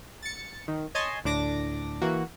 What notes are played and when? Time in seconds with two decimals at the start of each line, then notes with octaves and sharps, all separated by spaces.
0.23 A6 C#7
0.68 D#3
0.95 C#5 D#5 G#5 A5 C6
1.24 D2 A2 D4 D6 A#6
2.02 E3 A#3 F#4